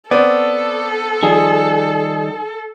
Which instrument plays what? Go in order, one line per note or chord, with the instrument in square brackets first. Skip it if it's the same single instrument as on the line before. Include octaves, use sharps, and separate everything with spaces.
[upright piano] B3 C4 [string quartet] A4 [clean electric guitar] D5
[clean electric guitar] D#3 G3 [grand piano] F3 G#4